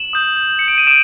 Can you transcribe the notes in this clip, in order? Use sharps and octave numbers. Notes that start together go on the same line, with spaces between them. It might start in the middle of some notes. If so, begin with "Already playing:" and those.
Already playing: E7 F#7
D#6 G6
C#7
D7
D#7
D#6 D7 E7